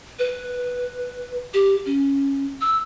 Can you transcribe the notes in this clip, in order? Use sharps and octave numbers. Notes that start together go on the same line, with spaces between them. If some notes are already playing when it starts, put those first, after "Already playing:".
B4
G4
C#4
E6